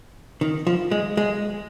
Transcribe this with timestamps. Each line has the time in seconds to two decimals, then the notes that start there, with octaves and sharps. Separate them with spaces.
0.41 D#3
0.67 F3
0.91 G#3
1.17 G#3